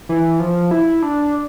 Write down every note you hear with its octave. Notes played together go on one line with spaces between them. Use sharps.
E3
F3
E4
D4